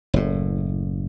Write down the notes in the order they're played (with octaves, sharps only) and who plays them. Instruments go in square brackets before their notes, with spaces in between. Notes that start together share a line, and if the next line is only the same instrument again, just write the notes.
[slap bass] F#1 A2